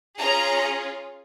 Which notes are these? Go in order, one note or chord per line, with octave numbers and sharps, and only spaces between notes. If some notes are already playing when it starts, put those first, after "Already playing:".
C#4 F4 G#4 A#5